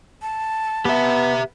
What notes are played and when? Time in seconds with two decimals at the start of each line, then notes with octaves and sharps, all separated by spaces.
0.22 A5
0.85 B3 G4 E5